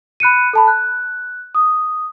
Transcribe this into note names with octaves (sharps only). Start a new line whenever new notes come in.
B5 F#6 C#7 D#7
A4 A5 B5
F#6
D#6